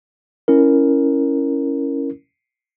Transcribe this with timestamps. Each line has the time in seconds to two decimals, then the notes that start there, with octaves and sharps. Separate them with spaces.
0.48 C#4 E4 A#4